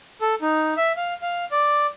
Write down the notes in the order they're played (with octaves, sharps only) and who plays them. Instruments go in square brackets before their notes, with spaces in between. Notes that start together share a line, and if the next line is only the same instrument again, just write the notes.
[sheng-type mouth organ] A4
D#4
E5
F5
F5
D5